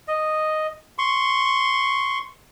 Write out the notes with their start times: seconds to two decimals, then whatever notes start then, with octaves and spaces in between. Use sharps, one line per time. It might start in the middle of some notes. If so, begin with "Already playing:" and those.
0.08 D#5
0.98 C6 C#6